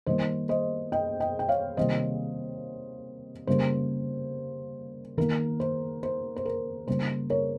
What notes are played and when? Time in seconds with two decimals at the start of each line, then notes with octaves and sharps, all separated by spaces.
0.06 D#3 G3 A#3 C5 D#5
0.49 C5 D#5
0.92 D#5 G5
1.20 D#5 G5
1.39 G5
1.48 C#5 F5
1.77 C3 D#3 G3 A#3 C5 D#5
3.47 C#3 G3 A#3 C5
5.17 D#3 A#3 A#4
5.60 C5
6.03 C5
6.36 C5
6.45 A#4
6.87 C#3 G3 A#3 C5
7.30 A#4 C#5